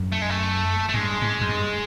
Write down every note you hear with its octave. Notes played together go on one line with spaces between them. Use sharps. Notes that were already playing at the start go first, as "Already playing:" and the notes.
Already playing: F#2
A3
G#3
A3
A3
G2 G#3
G#2
F#2
G2